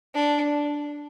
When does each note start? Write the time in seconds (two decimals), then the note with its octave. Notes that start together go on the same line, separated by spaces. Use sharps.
0.14 D4